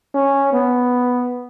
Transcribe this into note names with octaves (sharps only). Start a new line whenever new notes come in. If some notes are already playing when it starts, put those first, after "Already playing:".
C#4
B3